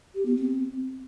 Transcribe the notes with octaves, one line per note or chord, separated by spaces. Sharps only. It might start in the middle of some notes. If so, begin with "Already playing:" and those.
G4
B3
C4